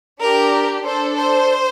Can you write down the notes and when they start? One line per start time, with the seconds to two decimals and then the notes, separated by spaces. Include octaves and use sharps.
0.19 D4 G4 A#4
0.85 D4 A4 C5
1.17 C5